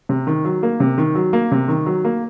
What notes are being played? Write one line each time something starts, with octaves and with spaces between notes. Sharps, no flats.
C3
D#3
F#3
A#3
C3
D#3
F#3
A#3
C3
D#3
F#3
A#3